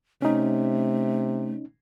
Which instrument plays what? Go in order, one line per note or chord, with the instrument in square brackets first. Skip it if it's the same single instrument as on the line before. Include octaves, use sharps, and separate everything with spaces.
[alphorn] C3 [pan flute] A3 [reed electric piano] C#4 D#4